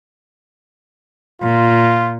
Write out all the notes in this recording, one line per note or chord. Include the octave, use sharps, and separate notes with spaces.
A#2 F4